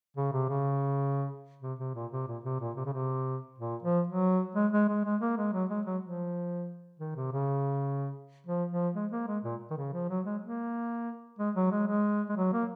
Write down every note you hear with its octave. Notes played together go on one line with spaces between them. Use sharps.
C#3
C3
C#3
C3
C3
A#2
C3
A#2
C3
A#2
C3
C#3
C3
A#2
F3
F#3
G#3
G#3
G#3
G#3
A#3
G#3
F#3
G#3
F#3
F3
D#3
C3
C#3
F3
F3
G#3
A#3
G#3
A#2
D#3
C#3
F3
F#3
G#3
A#3
G#3
F#3
G#3
G#3
G#3
F#3
A#3